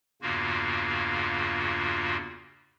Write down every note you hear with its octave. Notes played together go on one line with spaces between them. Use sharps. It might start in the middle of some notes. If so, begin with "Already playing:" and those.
E2 G2 C#3 A#3 F4 F#4